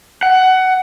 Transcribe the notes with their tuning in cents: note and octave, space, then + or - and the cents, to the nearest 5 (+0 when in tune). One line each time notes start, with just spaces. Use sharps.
F#5 +15